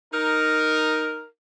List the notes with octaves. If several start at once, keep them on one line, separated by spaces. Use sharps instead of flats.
D#4 A#4